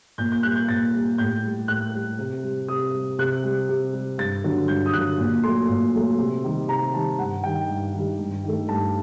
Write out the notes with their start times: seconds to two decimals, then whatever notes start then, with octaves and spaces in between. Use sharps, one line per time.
0.18 A#2 G6
0.32 G6
0.43 G3 F#6
0.56 G6
0.69 A#2 A6
0.94 G3
1.18 A2 G6
1.44 G3
1.68 A2 F#6
1.94 G3
2.19 C3
2.43 G3
2.68 C3 D#6
2.94 G3
3.19 C3 F#6
3.44 G3
3.69 C3
3.93 G3
4.18 G2 A6
4.44 D3 F#3
4.68 G2 G6
4.86 D#6
4.93 D3 F#3 F#6
5.18 A#2
5.44 F#3 A3 C6
5.69 A#2
5.94 F#3 A3
6.18 C3
6.44 D#3 G3
6.68 C3 A#5
6.94 D#3 G3 A5
7.19 G2 F#5
7.44 D#3 G3 G5
7.69 G2
7.94 D#3 G3
8.19 G2
8.43 D#3 A3
8.69 G2 A5